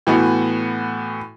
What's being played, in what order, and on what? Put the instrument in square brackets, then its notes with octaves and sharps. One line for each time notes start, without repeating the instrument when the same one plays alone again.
[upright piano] A2 E3 B3 F#4